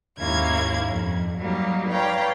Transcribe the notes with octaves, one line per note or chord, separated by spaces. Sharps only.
D#2 G#2 A#3 C#4 E4 G#6
F2
F#3 G3 A#3 D#4
B4 C#5 D5 F5 G5 A#5